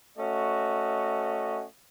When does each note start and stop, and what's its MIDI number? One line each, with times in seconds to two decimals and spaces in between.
0.18 1.64 57
0.18 1.64 61
0.18 1.64 66
0.18 1.64 75